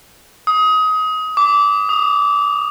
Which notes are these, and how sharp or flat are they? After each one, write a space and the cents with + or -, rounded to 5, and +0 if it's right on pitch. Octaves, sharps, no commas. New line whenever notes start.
D#6 +25
D6 -20
D#6 -25